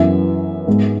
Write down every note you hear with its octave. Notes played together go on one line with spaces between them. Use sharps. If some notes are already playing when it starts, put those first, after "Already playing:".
Already playing: F#2 E3 B3 E5
G#2 G#3 B3